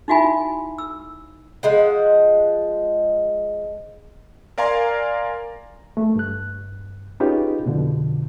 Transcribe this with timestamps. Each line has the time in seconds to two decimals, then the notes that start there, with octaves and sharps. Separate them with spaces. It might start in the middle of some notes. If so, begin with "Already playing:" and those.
0.08 D#4 E4 F#4 E5 G#5 B5
0.78 E6
1.63 F3 G#3 F#5
4.58 A#4 D5 F5 G#5 A#5 C6
5.97 A3
6.15 G2 F#6
7.20 C#4 D#4 F4 G4 G#4 B4
7.66 F2 B2 D3 F3